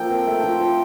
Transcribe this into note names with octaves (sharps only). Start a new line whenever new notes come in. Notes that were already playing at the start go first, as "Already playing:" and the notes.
Already playing: F3 A#3 F4 A4 G5
C4
A3
F3
F3